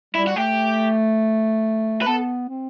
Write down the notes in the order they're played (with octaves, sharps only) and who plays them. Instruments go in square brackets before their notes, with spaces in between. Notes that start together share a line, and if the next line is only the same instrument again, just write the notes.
[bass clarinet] G3 [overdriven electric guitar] E4
[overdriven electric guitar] F#4
[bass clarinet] A3 [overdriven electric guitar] G4
[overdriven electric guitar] B4
[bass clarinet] B3 [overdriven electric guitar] A4
[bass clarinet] C4